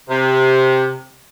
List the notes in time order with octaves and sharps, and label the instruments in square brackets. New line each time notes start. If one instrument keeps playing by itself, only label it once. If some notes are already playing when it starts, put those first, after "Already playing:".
[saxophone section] C3